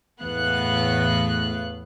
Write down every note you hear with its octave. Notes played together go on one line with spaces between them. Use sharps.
E2 A2 A3 B3 F5 F#6